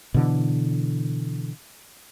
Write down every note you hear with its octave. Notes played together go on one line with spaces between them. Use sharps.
B2 D3 E3